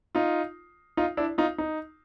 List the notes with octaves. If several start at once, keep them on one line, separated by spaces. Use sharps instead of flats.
D#4 F4
D#4 F4
D4 E4
D#4 F4
D#4